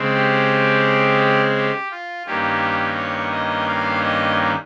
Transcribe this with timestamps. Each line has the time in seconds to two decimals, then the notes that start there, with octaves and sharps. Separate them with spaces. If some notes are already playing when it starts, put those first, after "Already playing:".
Already playing: C#3 G#3 C4
0.14 G4
1.56 G4
1.91 F4
2.26 G2 D#3 A#3 C#4 G4
2.97 C#5
3.32 D#5
3.67 F5
4.02 D#5